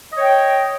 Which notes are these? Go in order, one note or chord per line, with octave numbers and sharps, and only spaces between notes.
C#5 D#5 G5